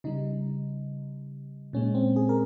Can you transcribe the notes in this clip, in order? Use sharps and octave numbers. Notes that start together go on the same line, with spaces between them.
C#3 G3 D#4
A#2 G#3 C#4
C4
G#4
A#4